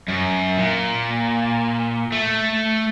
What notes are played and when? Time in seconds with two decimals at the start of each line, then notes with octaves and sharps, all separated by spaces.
0.09 F#2
0.59 A#2
2.12 A3